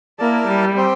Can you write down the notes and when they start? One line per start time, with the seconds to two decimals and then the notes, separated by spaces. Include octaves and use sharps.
0.19 A#3 E4 A#4 D5 A5
0.48 G3
0.76 C4 G4 C5 G5